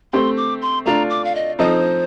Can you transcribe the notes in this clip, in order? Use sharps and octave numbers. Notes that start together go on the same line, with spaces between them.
A3 C4 G4 C6
D6
C6
A3 D4 F4 A#5
D6
F5
D#5
F3 C4 D#4 A4 C5 D#5